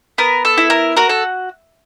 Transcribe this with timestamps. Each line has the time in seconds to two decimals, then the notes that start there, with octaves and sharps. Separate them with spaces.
0.18 B3 A#4
0.45 A4
0.57 E4
0.70 A#4
0.96 F#4 A#4
1.09 A4